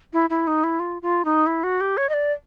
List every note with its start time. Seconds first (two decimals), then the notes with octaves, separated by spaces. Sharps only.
0.13 E4
0.30 E4
0.47 D#4
0.64 E4
0.80 F4
1.02 F4
1.25 D#4
1.47 E4
1.64 F#4
1.81 G4
1.97 C#5
2.09 D#5
2.14 D5